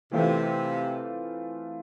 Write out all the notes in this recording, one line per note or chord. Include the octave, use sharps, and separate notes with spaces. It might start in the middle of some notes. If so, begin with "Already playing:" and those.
C3 E3 A3 C4 F4 A4